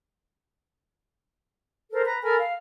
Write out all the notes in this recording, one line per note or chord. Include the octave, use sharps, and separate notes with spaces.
A4 A#4 C5
B4 A#5
A4 A#4 G#5 B5
F5